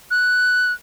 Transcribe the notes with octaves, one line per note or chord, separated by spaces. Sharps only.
F#6